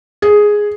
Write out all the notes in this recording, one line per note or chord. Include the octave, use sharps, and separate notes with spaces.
G#4